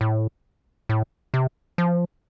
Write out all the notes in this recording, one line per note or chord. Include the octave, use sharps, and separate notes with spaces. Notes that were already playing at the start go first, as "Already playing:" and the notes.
A2
A2
C3
F3